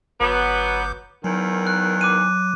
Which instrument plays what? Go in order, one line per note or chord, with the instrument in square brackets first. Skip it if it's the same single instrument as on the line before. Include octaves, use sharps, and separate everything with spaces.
[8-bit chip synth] G1 D6 G6 [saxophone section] F#3 B3
[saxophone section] E2 D#3 [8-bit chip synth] F#3
[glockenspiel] F#6
D6 F#6 D#7